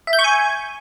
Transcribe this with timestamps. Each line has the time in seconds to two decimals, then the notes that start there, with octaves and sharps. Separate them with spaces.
0.07 E5
0.13 G6
0.19 C#6
0.24 G#5